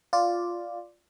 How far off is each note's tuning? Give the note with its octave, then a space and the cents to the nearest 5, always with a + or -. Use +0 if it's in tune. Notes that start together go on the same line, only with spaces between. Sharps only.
F4 +0 D5 +0